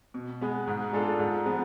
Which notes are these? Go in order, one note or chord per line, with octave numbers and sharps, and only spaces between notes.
B2
G#3 B3
G#2
G#3 D4 F4 A4
G#2
F3 G#3 B3